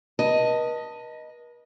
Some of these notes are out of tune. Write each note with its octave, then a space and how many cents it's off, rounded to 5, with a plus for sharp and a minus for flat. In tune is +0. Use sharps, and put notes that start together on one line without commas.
B4 -45 D#5 +0 A5 +20